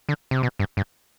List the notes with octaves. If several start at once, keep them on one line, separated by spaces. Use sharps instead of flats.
D3
C3
B2
G2
G2